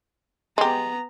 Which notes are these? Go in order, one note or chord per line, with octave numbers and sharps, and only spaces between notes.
G#3 B3 G4 A#5